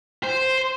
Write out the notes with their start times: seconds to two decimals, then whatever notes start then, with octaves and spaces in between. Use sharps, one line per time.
0.23 C5